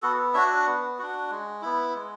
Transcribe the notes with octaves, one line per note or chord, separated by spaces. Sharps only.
B3 F#4 A4
D4 F#4 C#5 E5
B3
D4 F#4
G#3
B3 E4
G#3